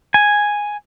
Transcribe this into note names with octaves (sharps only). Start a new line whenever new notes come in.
G#5